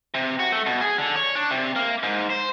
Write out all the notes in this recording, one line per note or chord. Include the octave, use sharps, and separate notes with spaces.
C3
F#4
A3
B2
G#4
D3
C#5
D4
C3
A#3
G#2
C5